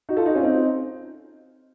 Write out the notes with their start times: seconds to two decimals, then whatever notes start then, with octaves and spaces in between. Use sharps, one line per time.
0.09 D#4 F#4
0.17 F4 A4
0.26 D#4 F#4
0.35 C#4 F4
0.43 C4 D#4